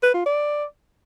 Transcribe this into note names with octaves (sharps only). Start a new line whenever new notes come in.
B4
F4
D5